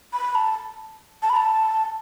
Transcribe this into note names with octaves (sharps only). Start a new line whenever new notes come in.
B5
A5
A5
B5
A5